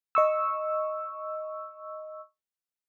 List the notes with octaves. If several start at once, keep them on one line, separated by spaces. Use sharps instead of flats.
D#5 C#6 E6